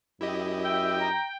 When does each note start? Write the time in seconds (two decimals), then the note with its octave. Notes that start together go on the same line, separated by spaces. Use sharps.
0.21 F#2 E4 G4 D#5
0.64 E5 G5
1.00 A#5